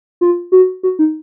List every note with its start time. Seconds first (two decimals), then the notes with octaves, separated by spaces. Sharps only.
0.21 F4
0.52 F#4
0.83 F#4
0.99 D#4